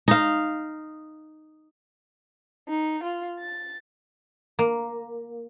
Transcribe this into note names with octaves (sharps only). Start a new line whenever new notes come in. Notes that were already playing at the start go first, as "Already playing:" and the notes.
D#4 F5
D#4
F4
A6
A#3